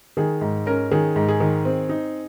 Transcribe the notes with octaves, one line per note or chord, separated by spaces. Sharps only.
D#3 G#4
G#2
C#4 A#4
D#3 G#4
G#2
G#4
D#3
C4
D#4